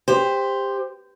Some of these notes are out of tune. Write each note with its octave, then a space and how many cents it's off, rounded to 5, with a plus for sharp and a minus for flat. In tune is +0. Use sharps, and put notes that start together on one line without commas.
G4 +20 C5 +0